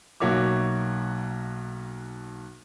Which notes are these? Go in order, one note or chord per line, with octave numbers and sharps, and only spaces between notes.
B1 A#3 F#4 C#5 E5 D6